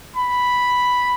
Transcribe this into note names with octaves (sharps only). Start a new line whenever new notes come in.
B5